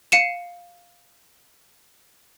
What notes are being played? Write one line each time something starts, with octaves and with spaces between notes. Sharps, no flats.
F5 C7 C#7 D#7 E7